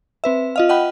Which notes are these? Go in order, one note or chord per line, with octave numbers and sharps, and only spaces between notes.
C4 B4 E5
F4 D#5 F5
D#5 F#5 G5 B5